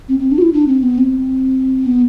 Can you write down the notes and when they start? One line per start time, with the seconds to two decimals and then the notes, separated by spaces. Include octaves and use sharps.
0.09 C4
0.19 C4
0.32 D4
0.38 F#4
0.42 E4
0.53 D4
0.68 C4
0.83 B3
0.98 C4
1.86 B3